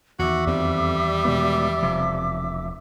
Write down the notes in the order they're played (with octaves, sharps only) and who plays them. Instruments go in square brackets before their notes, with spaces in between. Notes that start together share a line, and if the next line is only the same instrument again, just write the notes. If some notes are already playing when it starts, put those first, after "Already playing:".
[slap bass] E2 D#3 [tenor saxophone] F#4 [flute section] E5 D6 E6
[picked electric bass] F2 C4 [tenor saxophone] G3
[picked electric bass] B2 G#3 B3
[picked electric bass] E1 F3 [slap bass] C3